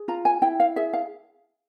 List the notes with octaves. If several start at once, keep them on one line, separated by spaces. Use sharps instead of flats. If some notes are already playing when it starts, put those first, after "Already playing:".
Already playing: G#4
F4 A#5
G#5
E4 G5
F5
G#4 E5
F5